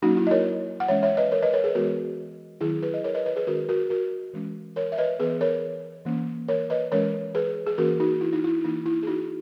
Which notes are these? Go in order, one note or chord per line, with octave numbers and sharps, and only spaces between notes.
F#3 A#3 C#4 D#4 F#4
E4
D#5
A#4 C#5
F#5
E3 G#3 C#4 C#5 E5
C#5 E5
B4 D#5
A#4 C#5
B4 D#5
A#4 C#5
G#4 B4
E3 G#3 B3 F#4 A#4
D#3 F#3 B3 E4 G#4
G#4 B4
D#5
A#4 C#5
B4 D#5
B4 D#5
G#4 B4
D#3 G#3 C#4 F#4 A#4
F#4 A#4
F#4 A#4
E3 G#3 C#4
A#4 C#5
E5
B4 D#5
E3 B3 G#4 B4
A#4 C#5
E3 A#3 C#4
A#4 C#5
B4 D#5
E3 G#3 C#4 A#4 C#5
G#4 B4
G#4
E3 A#3 C#4 F#4 A#4
D#4 F#4
E4
D#4
E4
E3 A#3 C#4 D#4
E4
G#4
D#4 F#4